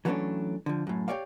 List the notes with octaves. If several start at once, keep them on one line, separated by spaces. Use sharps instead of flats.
E3 F#3 A3 A#3 C#4 D4
D3 F3
F#2 A2
G4 G#4 C#5 D5 F5